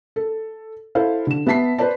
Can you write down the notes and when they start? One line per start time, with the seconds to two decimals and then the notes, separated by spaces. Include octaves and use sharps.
0.16 A4
0.95 E4 A4 C5 F5
1.27 D3 E7
1.46 B3 E5 A5 B6 C7
1.78 B4 C5 D5 A5